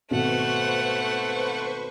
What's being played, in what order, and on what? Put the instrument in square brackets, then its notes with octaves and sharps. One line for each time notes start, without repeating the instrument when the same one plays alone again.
[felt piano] G#1 B2 [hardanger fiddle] A3 [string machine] B4 C5 C#6 [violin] F#5